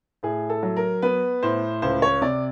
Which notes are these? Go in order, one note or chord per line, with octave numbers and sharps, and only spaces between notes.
A2 G#4
A4
F#3
A#4
B3 B4
A2 C5
C#2 C5
C#5
C3 D5